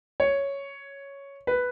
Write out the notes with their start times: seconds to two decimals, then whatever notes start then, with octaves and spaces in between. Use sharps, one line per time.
0.20 C#5
1.47 B4